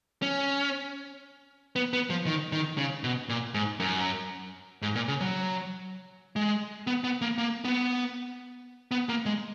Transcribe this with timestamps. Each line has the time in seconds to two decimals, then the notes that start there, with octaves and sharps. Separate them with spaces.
0.22 C#4
1.76 B3
1.93 B3
2.10 F3
2.26 D#3
2.52 D#3
2.78 C#3
3.04 B2
3.29 A#2
3.54 G#2
3.80 F#2
4.82 G#2
4.95 A#2
5.08 C#3
5.20 F#3
6.36 G#3
6.87 B3
7.04 B3
7.21 A#3
7.38 A#3
7.65 B3
8.91 B3
9.09 A#3
9.26 G#3